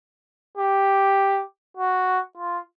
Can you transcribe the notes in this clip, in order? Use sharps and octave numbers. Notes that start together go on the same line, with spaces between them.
G4
F#4
F4